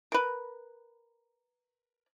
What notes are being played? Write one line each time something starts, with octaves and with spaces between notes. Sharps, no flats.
A#4 B4